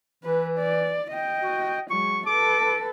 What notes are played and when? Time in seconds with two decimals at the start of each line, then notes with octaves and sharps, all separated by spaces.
0.24 E3 B4
0.59 D5
1.11 D#5 G5
1.43 F#4
1.91 F#3 G#3 C#6
2.26 A4 B4 D6